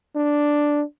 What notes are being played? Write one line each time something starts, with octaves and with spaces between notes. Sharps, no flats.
D4